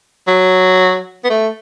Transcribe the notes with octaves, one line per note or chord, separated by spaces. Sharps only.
F#3
B3
A3